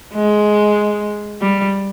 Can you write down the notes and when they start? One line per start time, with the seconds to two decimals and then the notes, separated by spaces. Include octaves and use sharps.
0.14 G#3
1.41 G3